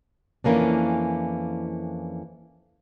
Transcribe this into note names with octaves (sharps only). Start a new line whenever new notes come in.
F2 E3 A#3 C#4 D4